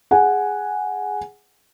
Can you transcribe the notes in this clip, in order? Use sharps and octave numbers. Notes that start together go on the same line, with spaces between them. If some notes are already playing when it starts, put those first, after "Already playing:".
G#4 F#5 G#5